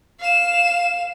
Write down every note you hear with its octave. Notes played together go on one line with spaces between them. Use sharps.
F5 E7